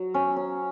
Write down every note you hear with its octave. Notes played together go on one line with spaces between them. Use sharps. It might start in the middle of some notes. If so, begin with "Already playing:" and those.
Already playing: F#3
C#4
C#4